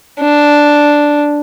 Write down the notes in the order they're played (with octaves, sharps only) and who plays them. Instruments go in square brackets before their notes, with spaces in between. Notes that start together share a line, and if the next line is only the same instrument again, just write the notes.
[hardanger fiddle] D4